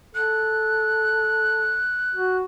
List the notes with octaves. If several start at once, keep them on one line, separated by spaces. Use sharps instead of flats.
A4 F#6
F#4